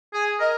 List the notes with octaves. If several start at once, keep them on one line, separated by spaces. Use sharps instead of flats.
G#4 G#5
A#4 D#5